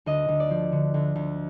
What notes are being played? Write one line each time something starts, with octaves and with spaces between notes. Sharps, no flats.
D2 D#5
D2
D5
F3
D3
D2
D2